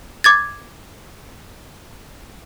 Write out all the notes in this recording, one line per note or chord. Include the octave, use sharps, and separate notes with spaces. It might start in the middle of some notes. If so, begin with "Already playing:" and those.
D6 G#6 A6